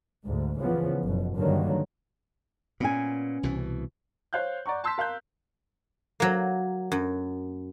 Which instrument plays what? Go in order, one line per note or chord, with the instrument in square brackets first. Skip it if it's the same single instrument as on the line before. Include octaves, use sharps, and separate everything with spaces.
[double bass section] D2 G#2
C#3 E3 F3 B3
F#1 B2
G2 D3 D#3 F#3 A#3
[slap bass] A#2 [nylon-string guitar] B3 C#4 G#5
[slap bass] C2 B2 E3
[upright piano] C5 C#5 F5 F#6 G6
D5 F#5 A#5 C#6
A5 C6 E6 G6 B6
A#4 F5 C6 F#6 G6
[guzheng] F#3 A#3
F#2